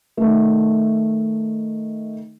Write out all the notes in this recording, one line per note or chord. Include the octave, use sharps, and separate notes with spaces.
D#3 A3